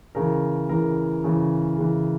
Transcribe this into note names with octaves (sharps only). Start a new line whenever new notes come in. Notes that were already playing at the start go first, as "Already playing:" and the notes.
C#3 E3 A#4
C#3 E3 A#4
C#3 E3
C#3 E3